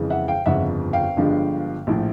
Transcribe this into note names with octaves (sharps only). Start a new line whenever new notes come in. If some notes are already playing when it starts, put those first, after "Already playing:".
Already playing: F2 C#3 E3 G#3
E5 F#5
F5 G5
G1 F2 C#3 F3 E5 F#5
F5 G5
G1 G2 D3 F3 G#3
A#1 A2 F3